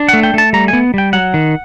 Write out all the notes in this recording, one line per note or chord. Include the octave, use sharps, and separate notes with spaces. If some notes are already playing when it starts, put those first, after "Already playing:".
Already playing: D4
A3 F#5
G5
A3 A5
G3 A#5
B3 G#5
G3 G5
F#3 F#5
D#3